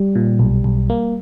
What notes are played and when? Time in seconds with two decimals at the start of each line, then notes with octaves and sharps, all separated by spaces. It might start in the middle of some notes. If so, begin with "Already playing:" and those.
Already playing: G3
0.15 A#2
0.39 B1
0.64 B1
0.90 A#3